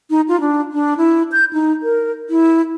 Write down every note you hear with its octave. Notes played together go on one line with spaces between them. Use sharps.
D#4
F4
D4
D4
E4
G6
D#4
A#4
E4